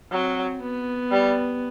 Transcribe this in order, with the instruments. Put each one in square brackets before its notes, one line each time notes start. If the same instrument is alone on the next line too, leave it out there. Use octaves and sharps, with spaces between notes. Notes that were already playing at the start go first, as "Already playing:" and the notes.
[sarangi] F#3 [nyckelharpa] C4
[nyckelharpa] B3
[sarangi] G3